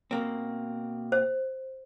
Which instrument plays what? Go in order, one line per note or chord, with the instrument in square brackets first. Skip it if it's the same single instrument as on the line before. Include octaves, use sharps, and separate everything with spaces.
[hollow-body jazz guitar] B2 A#3 C4
[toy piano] C5